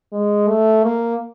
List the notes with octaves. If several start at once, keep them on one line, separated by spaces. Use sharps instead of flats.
G#3
A3
A#3